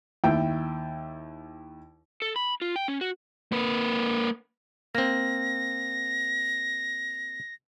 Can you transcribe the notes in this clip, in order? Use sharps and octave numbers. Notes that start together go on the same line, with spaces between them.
D#2 E4 G5
A4
B5
F4
G5
C#4
F#4
A#3 B4
A#3 C4 A#6